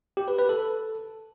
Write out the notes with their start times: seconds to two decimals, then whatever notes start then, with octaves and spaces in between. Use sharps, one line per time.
0.17 G4
0.28 B4
0.38 B4
0.49 A4